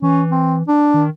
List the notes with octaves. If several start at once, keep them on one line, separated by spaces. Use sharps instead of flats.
E3 C#4
C4
D4
D#3